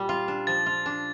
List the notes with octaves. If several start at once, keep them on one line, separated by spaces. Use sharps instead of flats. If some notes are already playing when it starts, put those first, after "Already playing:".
Already playing: A#2 G3
F4
D4
F3 A6
F4
D4